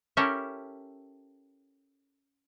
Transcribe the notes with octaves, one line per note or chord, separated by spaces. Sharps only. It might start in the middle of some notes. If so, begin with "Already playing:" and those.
C#4 E4 G4 A4 A#4